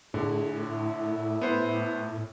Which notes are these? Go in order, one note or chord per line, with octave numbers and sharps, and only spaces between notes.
A2 D3 G#4
E4
B3 C5